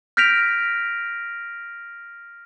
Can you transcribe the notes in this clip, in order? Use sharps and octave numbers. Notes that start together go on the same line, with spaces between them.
F6 G6 A#6 B6 D7 F7